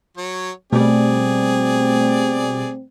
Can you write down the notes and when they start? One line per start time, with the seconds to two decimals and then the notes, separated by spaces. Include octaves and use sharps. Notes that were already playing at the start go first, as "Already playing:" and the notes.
0.17 F#3 C#5
0.73 B2 G3 A3 C4 G#4 D5